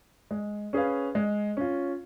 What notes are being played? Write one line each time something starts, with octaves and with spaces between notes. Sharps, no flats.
G#3
C#4 G#4 B4 F5
G#3
C#4 F4